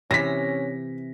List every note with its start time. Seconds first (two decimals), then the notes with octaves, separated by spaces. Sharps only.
0.11 C3 E3 C#4 A#6 B6